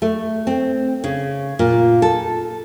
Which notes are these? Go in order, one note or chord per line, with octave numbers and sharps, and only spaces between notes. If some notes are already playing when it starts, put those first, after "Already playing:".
A3
C4
C#3
A#2
A4